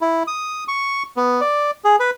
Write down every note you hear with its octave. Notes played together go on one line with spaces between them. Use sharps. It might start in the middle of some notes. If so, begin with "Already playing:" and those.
E4
D#6
C#6
B3
D5
G#4
B4